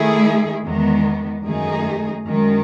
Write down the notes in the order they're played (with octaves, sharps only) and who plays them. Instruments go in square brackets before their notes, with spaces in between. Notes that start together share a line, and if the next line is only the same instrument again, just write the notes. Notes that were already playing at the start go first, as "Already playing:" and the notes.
Already playing: [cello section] D#3 A3 E4 G#4
E2 D#3 G#3 B3
F#2 D#3 A3 D#4 G#4
F#2 D#3 G#3